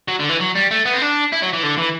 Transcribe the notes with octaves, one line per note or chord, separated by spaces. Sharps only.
F#3
D3
E3
F#3
G3
A3
B3
C4
D4
E4
F#3
E3
D3
E3